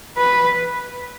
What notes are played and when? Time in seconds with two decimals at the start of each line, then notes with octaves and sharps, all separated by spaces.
0.17 B4